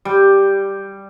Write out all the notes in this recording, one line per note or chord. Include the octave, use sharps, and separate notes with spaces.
G3